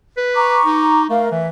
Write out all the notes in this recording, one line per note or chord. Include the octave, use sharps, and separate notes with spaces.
B4
A#5 C#6 D6
D#4
A3 A#4 F5
E3 E5